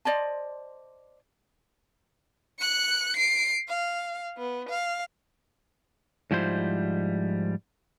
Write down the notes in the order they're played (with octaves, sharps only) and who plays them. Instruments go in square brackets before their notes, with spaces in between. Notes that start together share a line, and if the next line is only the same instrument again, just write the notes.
[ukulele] C5 D5 D#5 A5
[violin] F#6 C#7
C7 D7
F5
B3
F5
[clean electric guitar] G#2 F3 G3 E4 C5